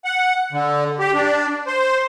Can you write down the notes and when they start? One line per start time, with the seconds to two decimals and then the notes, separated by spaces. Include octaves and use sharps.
0.05 F#5
0.52 D3
0.99 G4
1.15 D4
1.67 C5